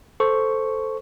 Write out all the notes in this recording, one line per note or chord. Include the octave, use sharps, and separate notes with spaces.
A4 C5 C#6